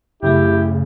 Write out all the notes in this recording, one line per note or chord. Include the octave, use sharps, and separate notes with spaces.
F#2 C#3 A3 E4 G4